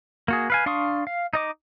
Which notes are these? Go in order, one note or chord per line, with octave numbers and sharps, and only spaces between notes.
A#3 F#4 G#4
B4 F5 G#5
D4 F5 C6 C#6 D#6
F5
D#4 D#5 D6